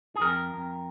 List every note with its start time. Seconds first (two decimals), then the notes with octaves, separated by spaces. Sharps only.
0.16 G#4
0.21 F2 A#4
0.54 F2